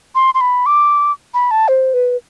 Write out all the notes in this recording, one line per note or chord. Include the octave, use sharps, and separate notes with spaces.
C6
C6
B5
D6
B5
A5
C5
B4